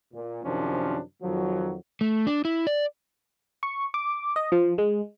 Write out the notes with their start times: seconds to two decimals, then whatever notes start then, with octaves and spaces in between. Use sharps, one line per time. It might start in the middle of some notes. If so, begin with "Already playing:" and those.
0.14 A#2
0.44 F#2 C3 D#3 F3 C#4 D4
1.23 F2 D#3 F3 F#3
2.01 A3
2.27 D4
2.45 E4
2.67 D5
3.63 C#6
3.94 D6
4.36 D#5
4.52 F3
4.78 G#3